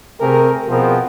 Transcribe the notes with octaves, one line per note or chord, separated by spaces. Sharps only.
C3 A3 G4 G#4 A#4
B2 F3 B3 C4 G#4 A#4